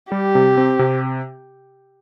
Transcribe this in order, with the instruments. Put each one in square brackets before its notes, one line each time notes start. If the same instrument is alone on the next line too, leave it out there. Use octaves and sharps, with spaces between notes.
[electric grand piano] G3 [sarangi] G4
[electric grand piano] C3
C4
C3